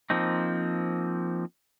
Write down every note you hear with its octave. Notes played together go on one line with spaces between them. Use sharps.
F3 A#3 C4 D#4